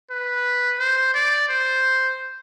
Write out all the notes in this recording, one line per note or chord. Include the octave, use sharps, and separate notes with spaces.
B4
C5
D5
C5